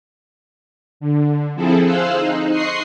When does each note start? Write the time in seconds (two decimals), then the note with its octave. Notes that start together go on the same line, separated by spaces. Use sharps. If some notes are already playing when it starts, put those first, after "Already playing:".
1.00 D3
1.56 F3 C4 E4 G#4 A4
1.84 G#4 C5 F5 E6 F#6
2.18 D#4
2.52 D#5 C6 C#6 D#6 F#6 C7